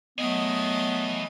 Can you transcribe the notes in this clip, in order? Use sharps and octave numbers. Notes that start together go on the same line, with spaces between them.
F#3 A3 B3 E4 G#4 D#5